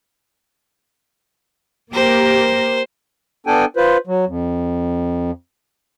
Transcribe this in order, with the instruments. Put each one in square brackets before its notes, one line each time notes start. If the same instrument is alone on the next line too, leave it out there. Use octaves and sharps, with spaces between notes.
[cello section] A#3 G4 A#4 [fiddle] C5
[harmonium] B3 D4 A4 G5 G#5
F4 B4 C5
F#3
F2